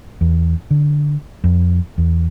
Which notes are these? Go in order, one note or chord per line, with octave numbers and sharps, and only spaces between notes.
E2
D3
F2
E2